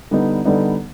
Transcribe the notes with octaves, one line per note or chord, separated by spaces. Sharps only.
D3 G3 B3 D#4
D3 G3 B3 D#4